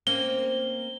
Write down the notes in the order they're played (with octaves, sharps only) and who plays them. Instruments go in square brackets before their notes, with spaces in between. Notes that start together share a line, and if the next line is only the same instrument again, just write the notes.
[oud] A#3 C4 C#4 [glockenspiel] G7